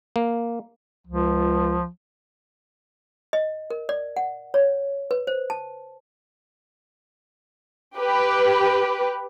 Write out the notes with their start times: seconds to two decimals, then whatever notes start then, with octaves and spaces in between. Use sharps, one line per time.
0.16 A#3
1.07 C#2 F3
3.33 D#5
3.70 A#4
3.89 D5
4.17 F#5
4.54 C#5
5.11 B4
5.27 C5
5.50 A5
7.97 G4 B4